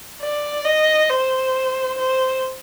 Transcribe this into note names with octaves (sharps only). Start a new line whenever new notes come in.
D5
D#5
C5
C5